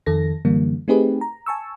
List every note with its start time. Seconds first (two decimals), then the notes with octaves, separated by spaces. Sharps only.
0.06 F2 D#3 A4 A#6
0.45 F#2 D3 E3 G3 A#3
0.88 A3 C4 D#4 G4 G#4 B4
1.21 A#5
1.46 G#5 A5 C#6 E6